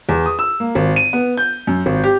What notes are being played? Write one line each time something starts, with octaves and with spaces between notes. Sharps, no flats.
E2
D#6
E6
A#3
G#1
D#7
B3
G6
F#2
G#1
G4